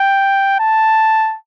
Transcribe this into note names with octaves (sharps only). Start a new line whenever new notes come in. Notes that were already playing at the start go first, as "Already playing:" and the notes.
Already playing: G5
A5